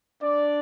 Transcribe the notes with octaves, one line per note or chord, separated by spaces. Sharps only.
D4 D5